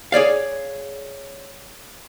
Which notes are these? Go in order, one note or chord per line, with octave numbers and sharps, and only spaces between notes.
G#4 C#5 D5 F5